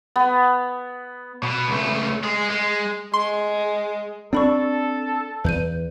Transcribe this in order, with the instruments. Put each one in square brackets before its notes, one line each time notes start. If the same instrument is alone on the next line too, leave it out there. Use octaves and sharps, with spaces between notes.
[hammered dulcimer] B3
[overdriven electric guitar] B2
C#2 A3
G#3 G#4
G#3
[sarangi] G#3 [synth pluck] C6
[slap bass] C4 D4 [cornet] A4 [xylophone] D5 B5 C#6
[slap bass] E2 [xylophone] B4 G6 D#7